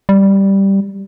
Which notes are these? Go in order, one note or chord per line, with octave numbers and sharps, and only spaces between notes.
G3